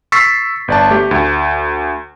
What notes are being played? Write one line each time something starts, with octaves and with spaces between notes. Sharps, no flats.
C#6 E6 A6 B6 C7
G1 D5 A5
A3 G4
D2